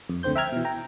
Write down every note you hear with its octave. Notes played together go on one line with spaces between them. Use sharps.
F2
D2 D3 C4 C5 G6
E5 G5 A#5 F6 G#6
B2 E3
G5 A#5